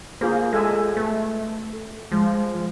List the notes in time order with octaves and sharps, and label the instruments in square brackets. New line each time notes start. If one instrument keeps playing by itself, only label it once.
[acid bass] A#3 [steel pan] F4 G#4 C5
[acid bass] G#3 [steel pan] A4 E5 G#5
[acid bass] A3 [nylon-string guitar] B4
[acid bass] F3 [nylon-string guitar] G#3